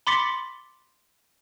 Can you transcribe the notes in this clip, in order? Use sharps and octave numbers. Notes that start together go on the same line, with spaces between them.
B5 C6 D6 A6 B6 C#7